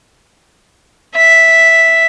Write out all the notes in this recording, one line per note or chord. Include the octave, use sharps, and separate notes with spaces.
E5